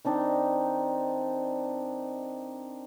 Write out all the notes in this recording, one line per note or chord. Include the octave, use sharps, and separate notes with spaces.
D#3 C4 D4 D#4